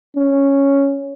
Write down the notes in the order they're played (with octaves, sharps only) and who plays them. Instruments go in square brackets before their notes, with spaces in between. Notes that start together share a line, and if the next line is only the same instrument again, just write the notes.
[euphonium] C#4